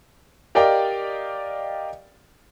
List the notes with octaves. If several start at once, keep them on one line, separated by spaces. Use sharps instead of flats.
G4 A#4 D5 D#5 F5 G5